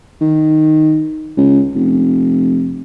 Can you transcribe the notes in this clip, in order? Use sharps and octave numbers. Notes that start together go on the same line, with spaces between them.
D#3
C#2
F1